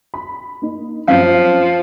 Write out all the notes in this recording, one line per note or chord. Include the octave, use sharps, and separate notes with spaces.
B5
A#3 D#4
F#2 F3 C4 C#4 F5